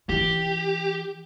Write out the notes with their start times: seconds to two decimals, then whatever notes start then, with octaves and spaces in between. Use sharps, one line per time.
0.09 E3 F4 G4